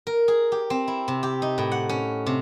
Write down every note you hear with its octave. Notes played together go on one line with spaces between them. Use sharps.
A#4
G#4
G4
C4
E4
C3
G4
D#4
A2
F#5
C#4
C3